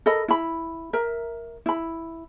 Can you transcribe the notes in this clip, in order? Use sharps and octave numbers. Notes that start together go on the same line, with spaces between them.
A4 A#4 D#5 B5
E4 B5
A#4 E5
E4 B5